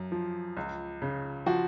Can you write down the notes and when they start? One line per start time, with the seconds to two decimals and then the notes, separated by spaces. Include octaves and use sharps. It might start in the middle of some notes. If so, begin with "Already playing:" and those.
Already playing: F#2
0.12 F3
0.57 C#2
1.02 C#3
1.46 F3 F#4